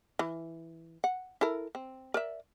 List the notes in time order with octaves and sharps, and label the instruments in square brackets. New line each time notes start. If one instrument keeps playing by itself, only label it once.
[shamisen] E3
F#5
E4 A4 A#4
C4
A#4 D5 E5